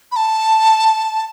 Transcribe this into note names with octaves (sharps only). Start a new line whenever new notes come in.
B5
A5